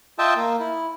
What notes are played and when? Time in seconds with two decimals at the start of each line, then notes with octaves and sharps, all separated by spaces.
0.19 F4 D#5 E5 G5 A5
0.36 A#3
0.60 E4